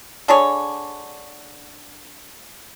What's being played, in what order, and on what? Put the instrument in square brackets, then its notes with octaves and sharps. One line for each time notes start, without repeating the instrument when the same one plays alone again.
[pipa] D3 D4 G#4 C#5